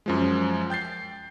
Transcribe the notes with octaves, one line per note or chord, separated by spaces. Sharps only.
F#2 F3 G#3
G5 G6 A6 C7